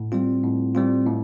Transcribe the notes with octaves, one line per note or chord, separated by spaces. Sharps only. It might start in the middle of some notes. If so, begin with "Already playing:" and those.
Already playing: A2
G3 C4 F4
A2
G3 C4 F4
A2